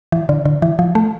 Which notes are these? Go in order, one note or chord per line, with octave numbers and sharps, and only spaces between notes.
E3
D3
D3
E3
F3
A3